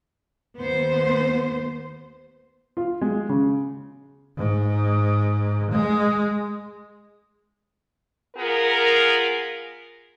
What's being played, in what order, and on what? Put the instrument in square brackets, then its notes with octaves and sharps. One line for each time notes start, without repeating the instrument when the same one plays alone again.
[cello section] D#2 B3 C5
[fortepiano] F4
G#3
C#3
[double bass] G#2
G#3
[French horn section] B3 F4 G#4 A#4